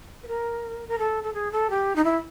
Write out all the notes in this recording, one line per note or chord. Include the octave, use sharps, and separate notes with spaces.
B4
A#4
A#4
A4
A4
G#4
A4
G4
D#4
E4